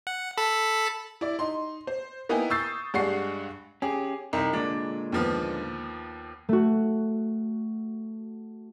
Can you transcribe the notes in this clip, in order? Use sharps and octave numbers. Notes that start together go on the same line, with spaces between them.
F#5
A4 A5 B5
E4 D5
D#4 C6
C5
A#3 B3 D#4 E4 G5 G#5
C#6 D#6 E6 G6 A6 C7
G2 G#3 D4 F#5 C#6 C7
C#4 G4 G#4
C2 D#4
A#2 D3 G#3 D4
D#2 F3 B3
A3 F#4